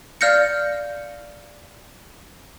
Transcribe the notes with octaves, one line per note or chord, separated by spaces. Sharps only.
D5 F5 F6 G6 A#6 C#7